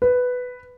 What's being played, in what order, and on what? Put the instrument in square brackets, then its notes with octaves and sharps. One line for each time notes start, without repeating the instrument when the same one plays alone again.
[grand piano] B4